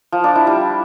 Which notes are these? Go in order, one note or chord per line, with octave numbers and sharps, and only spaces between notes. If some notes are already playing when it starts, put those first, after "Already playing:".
F3
D4
E4
G3